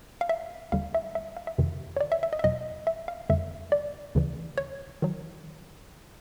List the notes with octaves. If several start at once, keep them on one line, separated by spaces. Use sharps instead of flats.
F5
E5
D#2 D3 G3 F5
E5
E5
F5
E5
F2 C3 D#3
C#5
D5
E5
E5
D#5
E5
E2 B2 F#3 D#5
E5
F5
F2 D3 G3 E5
D5
D2 C#3 E3
C#5
D#3 F#3